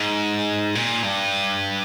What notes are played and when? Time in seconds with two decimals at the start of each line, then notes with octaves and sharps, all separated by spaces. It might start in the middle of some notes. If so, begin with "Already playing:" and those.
Already playing: G#2
0.75 A#2
1.03 G2